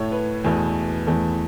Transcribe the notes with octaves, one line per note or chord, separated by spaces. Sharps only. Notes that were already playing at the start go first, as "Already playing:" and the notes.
Already playing: A2 A3 C#5
B4
E2 B2 A3
E2 E3 A3